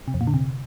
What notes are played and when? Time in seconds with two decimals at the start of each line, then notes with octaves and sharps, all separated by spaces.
0.08 C3
0.14 F2
0.21 A#2
0.27 D3
0.34 C3